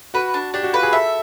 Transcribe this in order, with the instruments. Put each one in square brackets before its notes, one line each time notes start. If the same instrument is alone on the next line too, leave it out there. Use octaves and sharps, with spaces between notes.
[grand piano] F#4 [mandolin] B4
[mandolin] D4
[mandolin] D4 [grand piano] G4
[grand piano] F#4
[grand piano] F4 [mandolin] B4
[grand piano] G#4
[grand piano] A4 [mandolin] E5